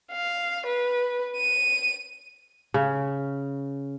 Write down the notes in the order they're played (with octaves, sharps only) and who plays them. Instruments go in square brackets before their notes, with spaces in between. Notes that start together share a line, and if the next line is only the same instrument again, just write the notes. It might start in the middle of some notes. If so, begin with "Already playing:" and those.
[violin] F5
B4
D#7
[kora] C#3